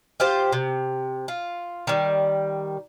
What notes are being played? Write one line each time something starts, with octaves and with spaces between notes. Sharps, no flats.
F4 G4 C5
C3
F4
D#3 G3